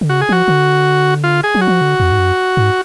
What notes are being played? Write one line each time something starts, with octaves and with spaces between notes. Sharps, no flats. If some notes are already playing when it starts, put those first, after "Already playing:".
D3
C#3 F#4
G#4
F3 F#4
D3
F4
G#4
F#3
F#4
F3
D3
F2
G#2
F#2
G#2